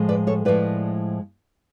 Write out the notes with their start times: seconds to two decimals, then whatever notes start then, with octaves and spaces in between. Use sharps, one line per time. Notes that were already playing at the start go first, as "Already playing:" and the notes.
Already playing: A2 F3 G#3
0.09 B4 D5
0.27 A4 C#5
0.45 A2 F3 G#3 B4 D5